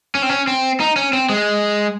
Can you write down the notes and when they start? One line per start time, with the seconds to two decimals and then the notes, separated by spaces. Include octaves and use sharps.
0.15 C#4
0.22 C4
0.29 C#4
0.47 C4
0.80 D#4
0.96 C#4
1.13 C4
1.29 G#3